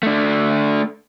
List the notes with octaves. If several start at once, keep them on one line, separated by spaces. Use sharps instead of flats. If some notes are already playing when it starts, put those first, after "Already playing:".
A3 D4